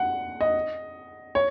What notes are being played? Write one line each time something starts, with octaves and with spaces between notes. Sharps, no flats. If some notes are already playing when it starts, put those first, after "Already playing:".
Already playing: F#5
D#5
C#5